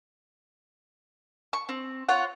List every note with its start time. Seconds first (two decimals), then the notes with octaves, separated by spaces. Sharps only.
1.53 C#6
1.69 C4
2.09 F4 C#5 F#5